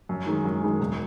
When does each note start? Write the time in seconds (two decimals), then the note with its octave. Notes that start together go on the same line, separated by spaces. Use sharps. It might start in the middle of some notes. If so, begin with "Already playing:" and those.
0.09 F#2
0.26 D#3 G#3
0.45 F#2
0.62 D#3 G#3
0.80 E1